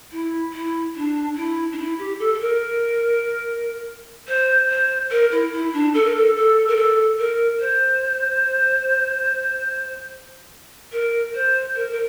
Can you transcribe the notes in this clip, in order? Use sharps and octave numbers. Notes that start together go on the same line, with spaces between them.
E4
E4
D4
E4
D4
E4
G4
A4
A4
A#4
C5
C5
A#4
E4
E4
D4
A4
A#4
A4
A4
A#4
A4
A#4
C5
A#4
C5
A#4
A#4